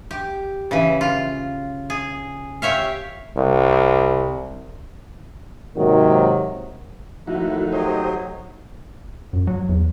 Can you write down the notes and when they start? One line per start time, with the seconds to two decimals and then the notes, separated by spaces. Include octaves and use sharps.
0.11 G4
0.71 C#3 E3
1.01 F4
1.90 G#4
2.62 G4 C#5 E5 F5
3.37 C2
5.76 G#2 C3 D#3 F#3 A#3
7.27 D#2 F3 A3 D#4 E4 F#4
7.73 F#3 G4 C5 D#5
9.33 F#2
9.47 F#3
9.69 E2